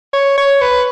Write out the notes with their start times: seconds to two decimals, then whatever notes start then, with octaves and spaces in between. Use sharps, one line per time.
0.13 C#5
0.38 C#5
0.61 B4